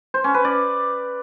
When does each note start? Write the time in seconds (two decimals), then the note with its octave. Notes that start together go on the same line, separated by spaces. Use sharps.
0.14 C5
0.24 C#4
0.34 B4
0.45 D5